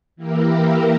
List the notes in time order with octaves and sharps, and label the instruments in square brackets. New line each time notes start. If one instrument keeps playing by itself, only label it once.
[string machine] E3 A#3 E4 G4 A#4